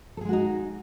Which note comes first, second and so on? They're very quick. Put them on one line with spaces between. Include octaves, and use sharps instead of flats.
A4 G#4 G#3 F#4 D#4